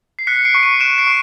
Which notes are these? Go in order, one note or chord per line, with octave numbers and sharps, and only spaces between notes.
C7
F#6 B6 C#7
C7 D7
C#6
C#7 D#7
F#6 D7 E7
C7 D7
C#6